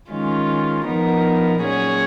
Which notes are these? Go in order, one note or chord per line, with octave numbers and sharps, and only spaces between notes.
D#3 G#3 C#4 F4
F3 B3 D#4 A#4
A#2 F#3 C#4 G#4 C#5